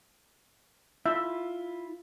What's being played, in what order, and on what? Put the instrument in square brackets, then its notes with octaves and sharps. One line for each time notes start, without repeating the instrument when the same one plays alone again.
[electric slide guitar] E4 F4 [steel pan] E5